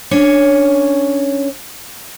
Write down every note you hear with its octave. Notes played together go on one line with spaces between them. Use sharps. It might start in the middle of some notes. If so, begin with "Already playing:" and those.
C#4 D4 C#5